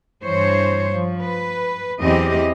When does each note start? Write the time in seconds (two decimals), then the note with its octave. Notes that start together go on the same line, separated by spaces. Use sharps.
0.22 G2 E3 C5 C#5
0.93 F3
1.23 B4
2.00 E2 E3 F#3 C4 G4 D#5